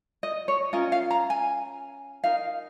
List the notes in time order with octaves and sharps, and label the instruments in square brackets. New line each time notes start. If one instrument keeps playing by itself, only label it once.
[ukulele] D#5
C#5
C#4 F4 A#4 D#5
F5
A#5
G#5
D#4 A#4 F5